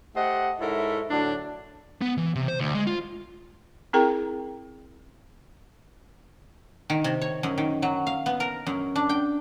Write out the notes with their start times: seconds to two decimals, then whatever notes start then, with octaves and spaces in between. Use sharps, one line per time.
0.16 A3 G4 C5 D#5 F#5
0.60 G#2 E4 A4 A#4 C#5 E5
1.09 A2 D3 F#3 D4
2.02 B3
2.17 E3
2.35 C3
2.48 C5
2.60 D2
2.75 G#3
2.87 F4
3.93 C4 E4 G#4 A#4 G5 A#5
6.90 D#3
7.04 C3
7.21 C#5
7.43 F#2
7.58 D#3
7.82 F#3
8.07 F5
8.26 B3
8.40 A#4
8.67 F#2
8.96 D4
9.09 G5